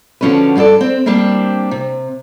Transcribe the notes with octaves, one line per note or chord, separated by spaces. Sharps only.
D3 F3 C#4 F#4 B4
G2 F#4 G#4 A4 D5
C4
G3 A#3 C4 D4 G4
C3